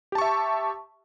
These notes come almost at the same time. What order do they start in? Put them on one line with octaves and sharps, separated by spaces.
G4 A5 C#6 E5